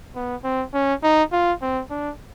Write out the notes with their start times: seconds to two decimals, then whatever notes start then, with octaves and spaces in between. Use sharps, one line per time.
0.15 B3
0.44 C4
0.74 C#4
1.03 D#4
1.32 F4
1.62 C4
1.90 D4